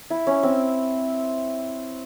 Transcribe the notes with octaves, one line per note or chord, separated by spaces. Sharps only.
E4
C#4
C4